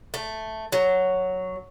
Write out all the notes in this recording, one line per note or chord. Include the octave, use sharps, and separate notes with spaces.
A3
F#3